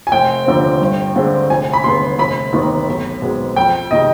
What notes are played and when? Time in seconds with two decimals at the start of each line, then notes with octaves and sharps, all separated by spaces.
0.07 G#5
0.12 F1 G5
0.46 D#2 D3 F3 C4
0.81 G2
1.16 D3 G#3 C4
1.50 F1 G#5
1.73 B5
1.84 D#2 D3 G#3 B3 C6
2.18 F1 B5
2.53 D#2 D#3 B3
2.88 B1
3.22 B2 G#3 C4
3.56 F2 G5
3.91 C3 D#3 G#3 D#5